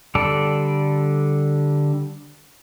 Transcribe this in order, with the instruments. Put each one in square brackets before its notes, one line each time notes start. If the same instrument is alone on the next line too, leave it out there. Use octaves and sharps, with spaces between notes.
[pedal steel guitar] D3 G3 A4 D5